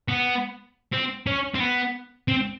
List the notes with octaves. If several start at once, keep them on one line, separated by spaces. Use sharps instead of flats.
B3
C4
C#4
C4
B3
C4